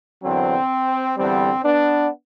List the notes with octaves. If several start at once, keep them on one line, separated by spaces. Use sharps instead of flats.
E2 D3 F#3 C4
E2 D3 G3 C4
B3 D4